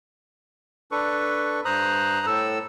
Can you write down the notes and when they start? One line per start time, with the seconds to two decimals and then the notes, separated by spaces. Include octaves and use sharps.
0.91 D4 A4 B4 C#6
1.65 G2 C5 A#5 D#6 F#6
2.26 A2 A4 E6